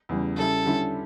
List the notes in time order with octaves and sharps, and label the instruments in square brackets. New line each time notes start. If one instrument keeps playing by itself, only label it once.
[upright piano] E2 C#3 G3
[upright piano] C#3 G3 C#4 E4 [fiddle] A4
[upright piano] D3 G3 C#4 E4